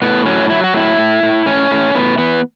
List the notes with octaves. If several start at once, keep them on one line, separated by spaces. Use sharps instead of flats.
A2 B3
F#3 C#4
F#3 E4
F#4
A2 E4
A2
A2
A2 C#4
A2
A2 B3
E3 B3